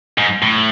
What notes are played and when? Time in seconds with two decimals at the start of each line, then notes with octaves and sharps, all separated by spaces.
0.18 G#2
0.42 A2